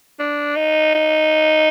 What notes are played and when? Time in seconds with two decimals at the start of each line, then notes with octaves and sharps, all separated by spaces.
0.19 D4
0.56 D#4
0.95 D#4